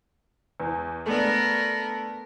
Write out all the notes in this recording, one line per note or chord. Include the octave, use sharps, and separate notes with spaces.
E2
A3 B3 D4 A#4